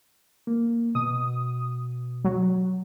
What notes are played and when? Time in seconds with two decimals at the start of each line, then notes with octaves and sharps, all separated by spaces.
0.47 A#3
0.95 B2 D#6
2.24 F#3